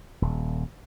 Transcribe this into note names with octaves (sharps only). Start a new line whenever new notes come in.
D#1